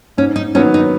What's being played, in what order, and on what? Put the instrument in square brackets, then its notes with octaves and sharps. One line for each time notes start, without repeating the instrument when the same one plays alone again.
[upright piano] G#2 [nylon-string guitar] C#4
[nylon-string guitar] D#4
[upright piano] D#3 F#3 B3 [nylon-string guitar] C#4
[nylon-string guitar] D#4